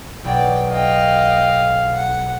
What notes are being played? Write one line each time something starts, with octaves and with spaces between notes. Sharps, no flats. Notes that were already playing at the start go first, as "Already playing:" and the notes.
B1 D5 G5
D#5 F5 G5
F#5